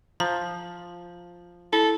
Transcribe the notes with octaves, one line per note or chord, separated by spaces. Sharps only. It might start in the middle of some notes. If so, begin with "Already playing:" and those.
F3 A#5
E4 A4